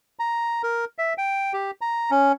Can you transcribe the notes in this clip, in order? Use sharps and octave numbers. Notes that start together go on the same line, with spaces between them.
A#5
A#4
E5
G5
G4
A#5
C#4